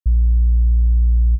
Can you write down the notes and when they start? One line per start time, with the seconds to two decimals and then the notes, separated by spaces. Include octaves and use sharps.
0.06 A#1